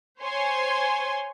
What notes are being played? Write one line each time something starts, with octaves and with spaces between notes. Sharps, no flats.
C5 C#5 G#5 C6